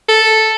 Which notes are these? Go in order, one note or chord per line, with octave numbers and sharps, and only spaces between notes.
A4